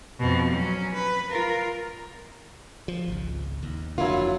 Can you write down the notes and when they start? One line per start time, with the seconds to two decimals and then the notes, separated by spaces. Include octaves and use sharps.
0.19 F2 B2
0.49 F#3 C#4
0.94 B4
1.30 F4 A#4
2.88 F3
3.08 G#1 C#2
3.63 D#2
3.98 F1 D3 F#3 A#3 D4 E4 F4